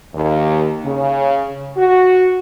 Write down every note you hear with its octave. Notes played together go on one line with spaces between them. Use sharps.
D#2
C#3
F#4